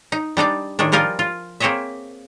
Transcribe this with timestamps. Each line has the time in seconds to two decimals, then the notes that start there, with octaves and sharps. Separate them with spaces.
0.12 D#4
0.37 G3 D4 D#4 D5
0.79 A2 D#3 G#3 D4
0.92 F3 G3 F4 A#4 D#5 G#5
1.19 F4
1.60 A#3 C4 G#4 C#5 D#5 E5